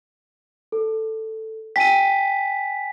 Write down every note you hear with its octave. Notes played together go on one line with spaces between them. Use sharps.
A4
G5 G#5 B6 D#7